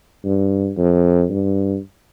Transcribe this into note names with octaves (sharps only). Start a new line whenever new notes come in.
G2
F2
G2